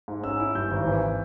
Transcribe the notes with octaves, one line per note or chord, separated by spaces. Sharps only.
G#2
C#4 E6
E4
G2 G6
G#1
E3